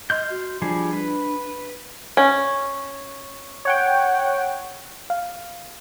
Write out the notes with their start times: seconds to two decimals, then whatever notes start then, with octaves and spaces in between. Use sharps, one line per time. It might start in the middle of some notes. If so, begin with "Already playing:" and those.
0.10 D#5 C6 F6 G6
0.30 F#4
0.62 F3 G3 D4 G#4
0.93 B4
2.17 C#4
3.65 C#5 F#5 G5
5.10 F5